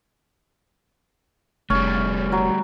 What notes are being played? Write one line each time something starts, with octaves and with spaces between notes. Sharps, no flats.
F1 G3 A3 C#4
F#3